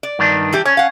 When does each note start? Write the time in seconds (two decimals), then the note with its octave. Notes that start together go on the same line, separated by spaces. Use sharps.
0.03 D5
0.19 G2 D#3 D4
0.52 E3 G3 G4
0.65 C#4 C#5
0.77 F5 F#5